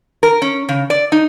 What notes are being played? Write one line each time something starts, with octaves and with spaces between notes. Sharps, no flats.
A#4
C#4
C#3
D5
D#4